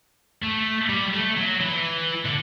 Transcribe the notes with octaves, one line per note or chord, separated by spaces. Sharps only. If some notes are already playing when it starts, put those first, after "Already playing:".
A3
G3
A3
F#3
E3
D3